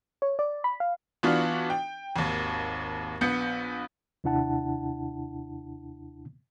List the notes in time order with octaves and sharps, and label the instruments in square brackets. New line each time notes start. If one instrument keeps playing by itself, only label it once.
[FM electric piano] C#5
D5
B5
F5
[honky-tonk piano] E3 B3 D4 F4 F#4
G5
G#1 D#2
A#1 B3 G6 C#7
[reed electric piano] D#2 C3 D4 E4 F#5 A5